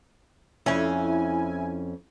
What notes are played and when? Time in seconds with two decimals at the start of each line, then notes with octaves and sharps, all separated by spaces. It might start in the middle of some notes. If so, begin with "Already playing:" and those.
0.66 F2 C#4 E4 G#5